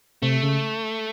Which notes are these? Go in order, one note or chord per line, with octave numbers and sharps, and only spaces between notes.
C3 A3
C#3